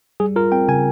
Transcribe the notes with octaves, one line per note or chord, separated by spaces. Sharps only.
G3 G#4
F4 A#4
C4 G5
C#3 G#5